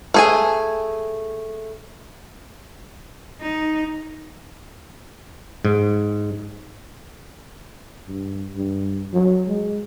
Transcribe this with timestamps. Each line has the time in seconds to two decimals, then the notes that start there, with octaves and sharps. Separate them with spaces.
0.14 A3 G#4 G#5
3.41 D#4
5.65 G#2
8.07 G2
8.56 G2
9.13 F#3
9.47 G#3